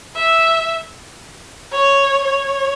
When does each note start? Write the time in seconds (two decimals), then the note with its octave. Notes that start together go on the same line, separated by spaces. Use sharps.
0.16 E5
1.72 C#5
2.24 C#5